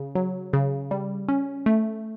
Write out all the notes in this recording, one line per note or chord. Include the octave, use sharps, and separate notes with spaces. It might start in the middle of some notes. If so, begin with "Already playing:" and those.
Already playing: C#3
F#3
C#3
G3
C#4
A3